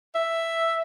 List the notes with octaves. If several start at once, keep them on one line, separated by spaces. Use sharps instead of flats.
E5